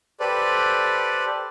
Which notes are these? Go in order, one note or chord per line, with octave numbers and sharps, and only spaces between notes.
G4 A4 B4 C5 D5